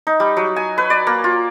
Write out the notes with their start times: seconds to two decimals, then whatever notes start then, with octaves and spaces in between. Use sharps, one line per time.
0.07 D#4
0.20 G3
0.37 F#3
0.56 G#5
0.78 B4
0.90 D5
1.07 A#3
1.24 F4